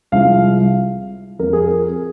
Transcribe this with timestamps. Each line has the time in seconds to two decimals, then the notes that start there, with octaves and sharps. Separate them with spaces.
0.12 C2 C3 F3 G#3 C4 F5
1.39 F2 F3 C4 A#4
1.53 G#4
1.66 A#4